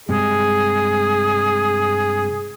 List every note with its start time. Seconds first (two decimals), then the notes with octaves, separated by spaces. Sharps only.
0.09 G2 C3 G#3 G#4